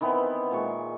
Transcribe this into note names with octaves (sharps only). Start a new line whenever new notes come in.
D#3 E3 B3 C4
A#2 G#3 C#6